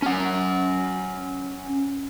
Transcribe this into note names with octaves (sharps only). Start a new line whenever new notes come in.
C#4 F#5